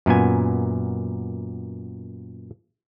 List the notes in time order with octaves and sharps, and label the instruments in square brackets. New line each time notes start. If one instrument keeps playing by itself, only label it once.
[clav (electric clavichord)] F#2 A#2 B3 G#5